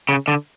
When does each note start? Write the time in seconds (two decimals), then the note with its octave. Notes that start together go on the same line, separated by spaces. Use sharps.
0.09 C#3
0.28 D3